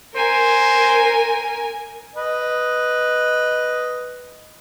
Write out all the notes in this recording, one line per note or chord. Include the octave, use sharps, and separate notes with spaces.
A#4 C5 G#5
B4 D#5